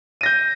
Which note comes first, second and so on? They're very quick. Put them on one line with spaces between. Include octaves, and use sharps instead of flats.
D#7 A#6 G6